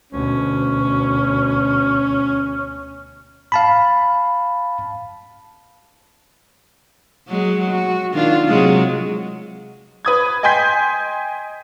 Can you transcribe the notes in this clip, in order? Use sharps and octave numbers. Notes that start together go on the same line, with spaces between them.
D2 B2 C#4
F5 A5 B5
F#3 G#3
F#4
D#3 D4 F4
C3 F#3 G#3
B4 D#6 G#6
D#5 G5 G#5 C6 G6 B6